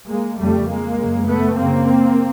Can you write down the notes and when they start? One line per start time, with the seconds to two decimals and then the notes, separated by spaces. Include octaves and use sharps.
0.10 G#3 A#3
0.39 F2 C#3 G3 A3
0.69 G#3 A#3
0.99 F#2 C#3
1.28 A3 B3
1.57 F#2 C#3 A#3 C4